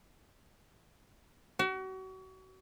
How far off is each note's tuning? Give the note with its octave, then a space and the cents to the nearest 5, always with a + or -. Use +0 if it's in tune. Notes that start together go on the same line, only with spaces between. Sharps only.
F#4 +35